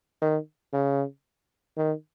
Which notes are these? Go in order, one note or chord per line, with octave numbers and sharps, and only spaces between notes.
D#3
C#3
D#3